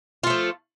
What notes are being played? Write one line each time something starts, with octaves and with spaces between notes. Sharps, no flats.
F3 A3 F4